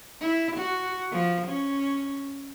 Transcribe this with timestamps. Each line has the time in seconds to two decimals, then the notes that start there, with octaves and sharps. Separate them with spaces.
0.20 E4
0.57 F#4
1.11 F3
1.48 C#4